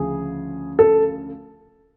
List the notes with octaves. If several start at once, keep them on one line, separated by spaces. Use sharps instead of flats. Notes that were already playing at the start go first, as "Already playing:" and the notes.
Already playing: D2 C#3 F3 G#4
A4